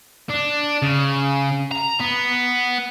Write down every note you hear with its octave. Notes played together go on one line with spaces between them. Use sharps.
D4
C#3
A#5
B3